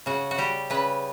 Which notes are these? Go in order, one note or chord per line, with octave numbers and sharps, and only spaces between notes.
C#3 F#4
F#4
G3 G4
C#3 B4